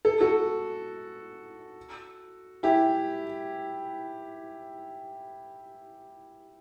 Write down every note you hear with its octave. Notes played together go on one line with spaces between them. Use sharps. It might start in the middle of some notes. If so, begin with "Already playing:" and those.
A4
F#4 A4
E4 G4